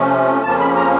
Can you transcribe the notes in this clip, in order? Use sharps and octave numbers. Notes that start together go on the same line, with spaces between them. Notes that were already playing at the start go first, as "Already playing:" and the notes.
Already playing: C3 F3 A3 C#4
F2 C#3 F3 A#3 C#4 A5
B5
A#5